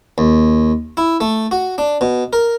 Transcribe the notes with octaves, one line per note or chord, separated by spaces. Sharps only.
D#2
E4
A3
F#4
D4
B2
A#4